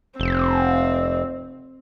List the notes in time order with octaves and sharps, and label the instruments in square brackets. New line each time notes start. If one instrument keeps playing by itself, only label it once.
[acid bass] F1 [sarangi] C4